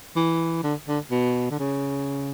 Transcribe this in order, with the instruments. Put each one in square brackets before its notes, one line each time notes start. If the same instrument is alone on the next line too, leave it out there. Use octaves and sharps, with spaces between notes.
[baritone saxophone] E3
D3
D3
B2
D3
C#3